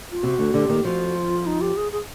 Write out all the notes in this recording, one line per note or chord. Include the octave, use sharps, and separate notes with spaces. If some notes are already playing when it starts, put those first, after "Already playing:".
F4
C3 F#4
D2 D3
D2 D3 G4
D#2 D#3
F2 F3 F#4
F4
D#4
G4
G#4
G#4